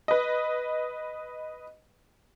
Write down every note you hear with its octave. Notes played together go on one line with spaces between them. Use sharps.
B4 D#5